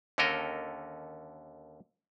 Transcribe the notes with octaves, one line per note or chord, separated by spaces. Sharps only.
D#2 D3 C#4 A4 A#4 D#5